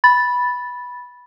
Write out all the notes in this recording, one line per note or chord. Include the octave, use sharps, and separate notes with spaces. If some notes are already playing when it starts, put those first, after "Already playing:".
B5 A6